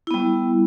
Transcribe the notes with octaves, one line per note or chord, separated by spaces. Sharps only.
G3 B3 E4